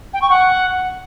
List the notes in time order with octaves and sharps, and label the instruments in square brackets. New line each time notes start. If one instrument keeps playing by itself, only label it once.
[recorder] G5
C#6
F#5